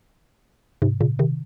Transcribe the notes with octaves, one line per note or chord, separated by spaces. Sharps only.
G#2 C3
A#2 C#3
C3 D#3